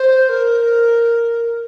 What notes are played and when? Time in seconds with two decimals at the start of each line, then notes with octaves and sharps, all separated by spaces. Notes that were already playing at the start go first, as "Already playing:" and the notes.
Already playing: C5
0.29 A#4